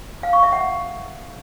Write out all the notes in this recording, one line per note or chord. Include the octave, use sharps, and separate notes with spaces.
F5
C#6
E5
F#5